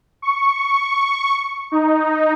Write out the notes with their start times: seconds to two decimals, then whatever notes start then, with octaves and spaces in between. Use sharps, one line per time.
0.22 C#6
1.72 D#4